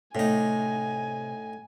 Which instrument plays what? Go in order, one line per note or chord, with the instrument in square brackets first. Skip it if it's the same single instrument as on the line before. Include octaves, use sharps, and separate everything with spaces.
[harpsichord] A2 D#4 [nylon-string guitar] C3 A3 [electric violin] G#5